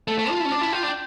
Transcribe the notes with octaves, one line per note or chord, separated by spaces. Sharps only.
A3 A5
A3
F4
E4
C#4
D4
E4
F4 G5
D4
G5